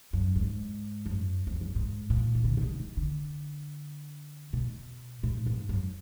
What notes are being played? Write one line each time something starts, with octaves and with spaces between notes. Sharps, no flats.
F#2
G#2
F#2
F2
F#2
G#2
A#2
D#3
D3
B2
D3
D#3
D3
B2
A#2
G#2
F#2